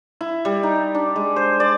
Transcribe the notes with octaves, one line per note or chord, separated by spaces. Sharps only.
E4
G3
D#4
D4
G#3
C5
D5